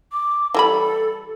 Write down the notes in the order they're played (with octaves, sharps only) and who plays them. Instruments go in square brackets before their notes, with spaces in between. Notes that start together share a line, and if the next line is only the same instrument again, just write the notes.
[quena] D6
[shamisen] E3 G3 B5 [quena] A4